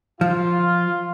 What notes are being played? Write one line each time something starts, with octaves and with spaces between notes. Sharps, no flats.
F3 F4